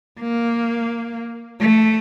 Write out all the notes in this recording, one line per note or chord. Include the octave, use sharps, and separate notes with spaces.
A#3
A3